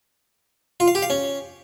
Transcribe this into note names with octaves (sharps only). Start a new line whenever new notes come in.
F4
F5
G4
F5
C#4